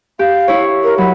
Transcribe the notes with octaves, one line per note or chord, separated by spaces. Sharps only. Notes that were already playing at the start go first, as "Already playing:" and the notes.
G4 F5
E4 C#5
A#4
F#3 B5